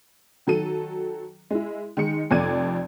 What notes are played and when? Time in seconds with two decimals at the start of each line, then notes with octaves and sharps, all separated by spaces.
0.47 D#3 F#3 A4 D#7
1.50 G#3 E4
1.97 D#3 G#3 D#4 C#7
2.30 F1 F2 D5 G#6 D#7